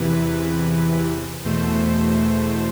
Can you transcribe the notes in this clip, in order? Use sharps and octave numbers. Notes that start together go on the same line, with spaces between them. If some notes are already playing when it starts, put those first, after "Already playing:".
Already playing: E2 C3 E3 B4
E2 B2 A3 C5